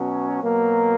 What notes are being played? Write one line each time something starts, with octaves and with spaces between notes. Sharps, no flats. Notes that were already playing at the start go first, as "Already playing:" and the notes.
Already playing: B2 F#3 C#4
B2 F#3 A#3